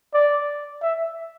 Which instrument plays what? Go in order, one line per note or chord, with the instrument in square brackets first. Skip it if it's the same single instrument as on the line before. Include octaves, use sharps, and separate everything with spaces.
[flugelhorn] D5
E5